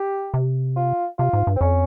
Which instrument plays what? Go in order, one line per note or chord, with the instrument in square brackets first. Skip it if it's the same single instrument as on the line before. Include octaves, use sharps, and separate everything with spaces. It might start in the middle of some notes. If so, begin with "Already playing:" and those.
Already playing: [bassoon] G4
[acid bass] C3
[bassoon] F4
[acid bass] C3 [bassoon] F4
[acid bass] G#2
G2
[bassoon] C4
[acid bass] F2 [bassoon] C#4